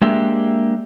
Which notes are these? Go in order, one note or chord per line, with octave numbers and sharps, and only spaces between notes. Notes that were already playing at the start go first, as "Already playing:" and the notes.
G#3 A#3 D4 G4 E5